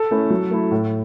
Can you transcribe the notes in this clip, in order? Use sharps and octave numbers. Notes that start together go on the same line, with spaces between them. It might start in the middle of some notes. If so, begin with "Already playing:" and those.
Already playing: A4
A3 C#4 E4
F#3
A3 E4
A2